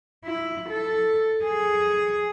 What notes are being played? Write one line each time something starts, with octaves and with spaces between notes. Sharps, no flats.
E4
A4
G#4